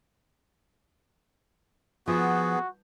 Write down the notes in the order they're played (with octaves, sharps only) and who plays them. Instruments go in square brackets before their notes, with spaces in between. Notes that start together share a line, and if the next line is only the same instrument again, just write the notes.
[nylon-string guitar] F3 [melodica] B3 G#4 [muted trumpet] F#4